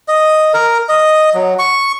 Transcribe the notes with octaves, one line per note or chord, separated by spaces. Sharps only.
D#5
A#4
D#5
F#3
C#6